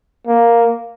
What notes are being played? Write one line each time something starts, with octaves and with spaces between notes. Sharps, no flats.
A#3